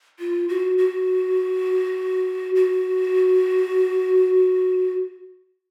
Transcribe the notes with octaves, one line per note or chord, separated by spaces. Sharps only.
F4
F#4
F#4
F#4